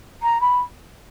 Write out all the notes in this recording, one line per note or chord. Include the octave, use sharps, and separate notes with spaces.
A#5
B5